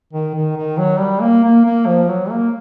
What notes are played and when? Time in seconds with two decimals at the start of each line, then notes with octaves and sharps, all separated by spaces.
0.13 D#3
0.35 D#3
0.56 D#3
0.78 F#3
0.99 G3
1.21 A#3
1.44 A#3
1.65 A#3
1.87 F3
2.09 F#3
2.30 A#3